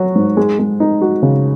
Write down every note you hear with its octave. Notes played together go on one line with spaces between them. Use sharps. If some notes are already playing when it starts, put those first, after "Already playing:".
Already playing: F#3 F#4
G#2
G#3
G#3
D#4
F#4
C#3